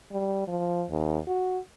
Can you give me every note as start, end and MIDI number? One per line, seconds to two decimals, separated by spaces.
0.11 0.43 55
0.47 0.84 53
0.90 1.19 39
1.27 1.59 66